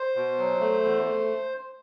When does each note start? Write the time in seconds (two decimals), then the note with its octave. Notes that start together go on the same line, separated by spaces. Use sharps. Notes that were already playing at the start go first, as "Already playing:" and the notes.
Already playing: C5
0.16 B2
0.38 F#3
0.60 A3
0.83 E2
1.05 A3